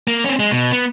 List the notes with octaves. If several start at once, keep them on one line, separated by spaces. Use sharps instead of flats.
A#3
C4 C#4
G#3
B2
B3